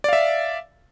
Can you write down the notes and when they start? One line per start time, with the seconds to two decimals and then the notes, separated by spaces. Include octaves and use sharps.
0.04 D5
0.09 F5
0.13 E5